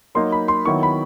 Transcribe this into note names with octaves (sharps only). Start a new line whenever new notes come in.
F#3 A#3 D#4 C6
B5
C6
D#3 F#3 B3 E4 C#6
B5